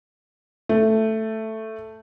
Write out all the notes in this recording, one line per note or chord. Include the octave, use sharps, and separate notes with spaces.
A3